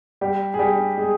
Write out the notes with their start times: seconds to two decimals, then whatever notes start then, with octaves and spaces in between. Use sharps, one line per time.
0.21 G3 G4
0.54 G#4
0.59 G3 G4
0.98 G#3 G#4